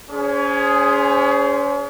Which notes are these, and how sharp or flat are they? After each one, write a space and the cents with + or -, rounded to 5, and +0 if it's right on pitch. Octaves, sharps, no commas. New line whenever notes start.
C#4 +35 G#4 +0 C5 +0